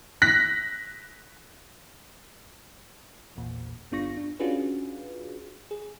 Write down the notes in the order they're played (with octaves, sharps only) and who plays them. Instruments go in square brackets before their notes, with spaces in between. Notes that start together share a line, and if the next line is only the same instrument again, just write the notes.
[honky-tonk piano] F#6 A#6 B6
[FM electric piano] A1 E2 A#2
G1 B3 D4 F4 C#6 A#6
D4
C#4 D4 F4 F#4 G#4 B4
G#4